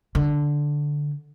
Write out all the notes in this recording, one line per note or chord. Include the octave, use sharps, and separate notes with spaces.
D3